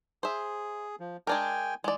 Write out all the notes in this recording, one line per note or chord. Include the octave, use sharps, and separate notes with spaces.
G#4 C5 E5
F3
G#3 D4 A#4 G5 G#5
E3 G#3 D5